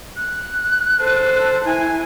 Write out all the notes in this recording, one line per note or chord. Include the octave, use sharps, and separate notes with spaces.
F#6
A4 C5
E4 G#5